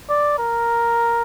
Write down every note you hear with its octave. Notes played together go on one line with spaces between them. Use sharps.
D5
A#4